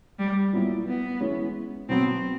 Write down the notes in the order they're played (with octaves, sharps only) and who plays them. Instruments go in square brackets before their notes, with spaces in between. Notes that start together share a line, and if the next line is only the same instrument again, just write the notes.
[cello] G3
[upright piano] A#2 F#3 B3 E4
[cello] B3
[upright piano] E3 G#3 C#4 E4
[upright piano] B2 F#3 B3 [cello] C4